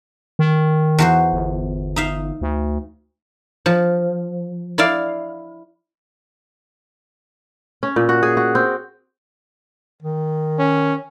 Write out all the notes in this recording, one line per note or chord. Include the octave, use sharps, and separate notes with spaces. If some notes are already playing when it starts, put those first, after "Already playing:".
D#3
E2 F#4 C5
G1
D#4 E5 F5
D2
F3
E4 D5 F5
C#4
A#2
F#4
G#4
F#4
C4
D#3
C#4